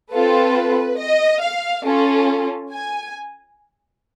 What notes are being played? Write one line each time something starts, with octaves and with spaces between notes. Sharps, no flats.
C4 F4 A4 B4
D#5
F5
C#4 F4 A4
G#5